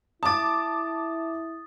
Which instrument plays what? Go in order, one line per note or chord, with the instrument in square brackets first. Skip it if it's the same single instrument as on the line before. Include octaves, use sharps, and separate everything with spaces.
[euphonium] E4 [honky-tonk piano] A5 D6 [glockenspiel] D#6 A6